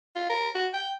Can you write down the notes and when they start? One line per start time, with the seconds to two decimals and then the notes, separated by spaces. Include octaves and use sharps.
0.16 F4
0.30 A#4
0.55 F#4
0.74 G5